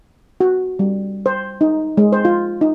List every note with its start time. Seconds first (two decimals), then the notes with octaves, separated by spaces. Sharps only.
0.40 F#4
0.79 G3
1.26 C5
1.61 D#4
1.97 G#3
2.13 C5
2.25 F4
2.61 D#4